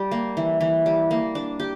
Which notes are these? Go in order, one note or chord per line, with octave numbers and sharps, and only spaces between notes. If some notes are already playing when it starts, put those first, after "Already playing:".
Already playing: G3
A#3
E3
E3
G3
A#3
D4
G4